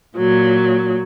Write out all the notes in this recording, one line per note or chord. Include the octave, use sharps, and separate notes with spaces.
A#2 F#3